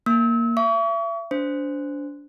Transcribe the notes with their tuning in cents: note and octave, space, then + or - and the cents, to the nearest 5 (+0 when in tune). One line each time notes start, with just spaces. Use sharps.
A#3 +0 E6 -35
E5 +35 C#6 +40
D4 -25 C5 -15